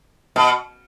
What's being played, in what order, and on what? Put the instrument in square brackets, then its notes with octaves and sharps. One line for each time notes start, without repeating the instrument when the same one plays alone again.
[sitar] B2